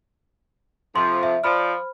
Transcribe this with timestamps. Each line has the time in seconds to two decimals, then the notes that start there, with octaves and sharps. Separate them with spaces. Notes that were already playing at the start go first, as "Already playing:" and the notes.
0.96 F2 C3 F3 C6
1.23 E5
1.44 F3 C5 D5 B5 F6